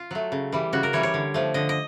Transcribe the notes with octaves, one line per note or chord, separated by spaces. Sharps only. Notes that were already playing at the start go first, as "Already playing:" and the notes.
Already playing: F4
F#3 A3
C#3
E3 G3
C#3 F#4
A#4
E3 G3 C#5
C#5
D3
F3 A3
D3 D#5
D#5